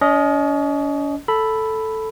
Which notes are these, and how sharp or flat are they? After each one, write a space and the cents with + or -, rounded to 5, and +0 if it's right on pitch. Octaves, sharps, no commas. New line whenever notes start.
C#4 +45 D#5 +0
A4 +0 B5 +0